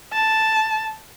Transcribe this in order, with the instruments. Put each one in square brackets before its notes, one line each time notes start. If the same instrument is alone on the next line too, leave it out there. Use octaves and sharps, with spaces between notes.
[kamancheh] A5